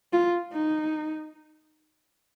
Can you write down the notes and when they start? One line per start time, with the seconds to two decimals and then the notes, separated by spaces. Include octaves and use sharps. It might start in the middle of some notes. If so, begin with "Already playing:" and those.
0.13 F4
0.52 D#4